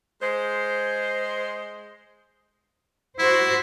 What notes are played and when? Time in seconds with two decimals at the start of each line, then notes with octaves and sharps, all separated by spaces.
0.20 G#3 C5
3.19 E4 F#4 C5